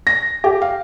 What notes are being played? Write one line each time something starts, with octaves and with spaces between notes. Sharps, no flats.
A#6
G4
F5